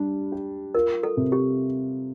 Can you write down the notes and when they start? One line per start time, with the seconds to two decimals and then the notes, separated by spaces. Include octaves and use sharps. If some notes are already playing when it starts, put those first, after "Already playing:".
Already playing: G3 D4
0.32 G4
0.75 F4 A#4
1.03 A4
1.17 C3
1.32 G4